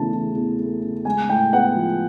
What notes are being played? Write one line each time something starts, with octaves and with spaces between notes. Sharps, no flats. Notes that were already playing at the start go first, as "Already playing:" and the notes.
Already playing: E2 C#3 E3 A3 A5
E3
E2
A3
C#3
G#3 G#5
A2 G5
B3 F#5
F3